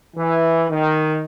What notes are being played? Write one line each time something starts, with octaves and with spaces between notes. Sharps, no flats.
E3
D#3